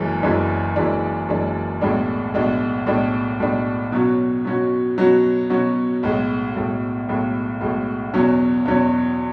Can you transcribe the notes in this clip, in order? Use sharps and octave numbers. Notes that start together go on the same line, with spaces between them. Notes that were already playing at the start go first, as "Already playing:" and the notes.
Already playing: F#1 F#2 E3 G#3
F#1 F#2 E3 G#3 D4
F#1 F#2 E3 G#3 D4
F#1 F#2 E3 G#3 D4
B1 A2 G#3 D4
B1 A2 G#3 D4
B1 A2 G#3 D4
B1 A2 G#3 D4
B2 F#3 C#4 F#4
B2 F#3 C#4 F#4
B2 F#3 C#4 F#4
B2 F#3 C#4 F#4
B1 A2 G#3
B1 A2 G#3
B1 A2 G#3
B1 A2 G#3
E2 B2 F#3 C#4
E2 B2 F#3 C#4